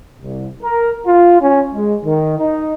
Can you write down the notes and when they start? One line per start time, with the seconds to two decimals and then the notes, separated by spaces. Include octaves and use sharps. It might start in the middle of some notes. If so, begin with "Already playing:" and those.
0.22 C2
0.62 A#4
1.06 F4
1.41 C#4
1.73 G#3
2.04 D#3
2.39 D#4